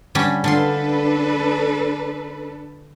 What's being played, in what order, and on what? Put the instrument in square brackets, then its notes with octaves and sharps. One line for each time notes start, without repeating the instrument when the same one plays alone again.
[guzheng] D3 G3 C#4
[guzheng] D3 F4 C6 [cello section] D4 A4 B4